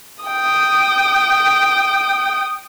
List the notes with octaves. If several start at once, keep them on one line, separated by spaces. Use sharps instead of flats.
G5 D#6